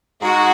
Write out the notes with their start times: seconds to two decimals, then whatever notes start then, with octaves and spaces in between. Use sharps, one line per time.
0.22 G#2 G#3 F#4